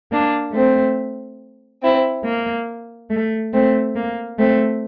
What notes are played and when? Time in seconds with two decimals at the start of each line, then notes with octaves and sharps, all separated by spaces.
0.12 A#3 D4
0.54 A3 C4
1.82 C4 E4
2.25 A#3
3.10 A3
3.53 A3 C4
3.96 A#3
4.38 A3 C4